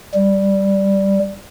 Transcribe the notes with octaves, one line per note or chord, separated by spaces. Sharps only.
G3